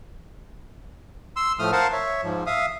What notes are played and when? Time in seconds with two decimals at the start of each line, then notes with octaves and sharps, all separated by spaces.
1.36 C6 E6
1.59 A2 F3 A3 D#6 F6
1.72 A#4 C5 F5 F#5 A5
1.92 C#5 E5
2.24 G#2 F3
2.46 E5 F5 D#6